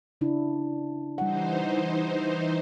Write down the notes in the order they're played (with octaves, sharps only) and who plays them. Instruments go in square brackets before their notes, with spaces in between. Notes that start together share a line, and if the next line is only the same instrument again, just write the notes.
[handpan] C#3 D4 E4
[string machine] E3 D#4 C5 [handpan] G3 F#5